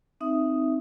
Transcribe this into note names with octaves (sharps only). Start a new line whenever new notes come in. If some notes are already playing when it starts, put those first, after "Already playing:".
C4 D#4 E5 D#6